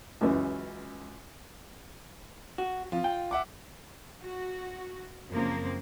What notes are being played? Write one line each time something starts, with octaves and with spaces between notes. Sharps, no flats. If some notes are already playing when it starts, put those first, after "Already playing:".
C#2 F#2 E3
F#4
F2 F4
G5
E5 F#5 D6
F#4
F#2 C#3 F3 A#3 C4